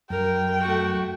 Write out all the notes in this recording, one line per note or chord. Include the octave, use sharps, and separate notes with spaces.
F#2 A#4 G5
A3 F#4